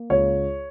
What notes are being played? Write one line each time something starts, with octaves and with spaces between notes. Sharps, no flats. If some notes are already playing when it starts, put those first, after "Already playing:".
Already playing: A#3
C#2 C#5